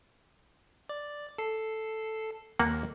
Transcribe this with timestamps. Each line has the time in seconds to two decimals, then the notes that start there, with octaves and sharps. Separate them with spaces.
0.89 D5
1.38 A4 C7
2.59 D#2 A#3 F#5